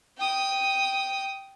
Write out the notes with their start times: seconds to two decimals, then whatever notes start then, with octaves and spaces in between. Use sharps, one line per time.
0.17 G5 D#6